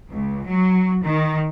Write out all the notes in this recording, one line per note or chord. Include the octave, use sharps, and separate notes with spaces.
C#2
F#3
D#3